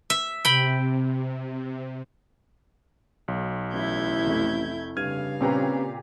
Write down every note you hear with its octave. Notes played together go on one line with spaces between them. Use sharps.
E5
C3 G5 B5
B1
A1 E4 G6 G#6
F1 A3
G2 C#3 F5 F6 G#6 D#7
A#2 C4 C#4 G4 B4 A#5